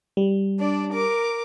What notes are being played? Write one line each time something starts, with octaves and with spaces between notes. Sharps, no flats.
G3
D4 D5
A#4 D6